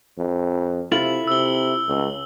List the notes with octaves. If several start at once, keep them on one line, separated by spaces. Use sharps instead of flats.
F2
C3 E4 F4 A4 F#7
C3 E6 G7
C#2